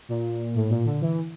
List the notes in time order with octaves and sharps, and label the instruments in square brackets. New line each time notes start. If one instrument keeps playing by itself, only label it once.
[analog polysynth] A#2
A2
A#2
D3
E3